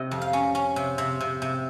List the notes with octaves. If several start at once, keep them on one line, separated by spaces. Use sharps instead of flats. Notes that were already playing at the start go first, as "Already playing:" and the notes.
Already playing: C3 D#5
F2
F5
C#4
C#4
C3
C3
C3
C3